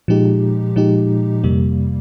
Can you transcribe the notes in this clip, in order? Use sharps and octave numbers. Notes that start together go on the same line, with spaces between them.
A#2 F3 G#3 D#4 G4
A#2 F3 G#3 D#4 G4
F2 C3 G3 A#3